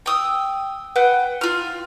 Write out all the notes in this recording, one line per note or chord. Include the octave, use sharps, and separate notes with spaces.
G5 D#6 E6
B4 F#5 G5
F4 F6